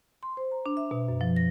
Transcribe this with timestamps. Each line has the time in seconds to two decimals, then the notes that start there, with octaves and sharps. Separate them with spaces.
0.23 C6
0.37 C5
0.51 A#5
0.66 D4
0.77 E5
0.91 B2
1.08 F#2
1.21 F3
1.36 A#6